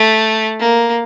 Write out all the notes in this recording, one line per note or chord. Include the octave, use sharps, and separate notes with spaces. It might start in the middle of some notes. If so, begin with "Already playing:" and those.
Already playing: A3
A#3